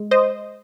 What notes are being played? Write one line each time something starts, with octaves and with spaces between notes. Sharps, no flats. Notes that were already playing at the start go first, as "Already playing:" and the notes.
Already playing: G#3
C5 D#5